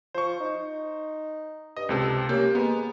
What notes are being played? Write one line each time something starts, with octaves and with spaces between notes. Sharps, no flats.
F3 C5 C#6
D#4
G2 D#5
C#2 C3 A4
A#3 C#4 G4
G#3 A#3 B3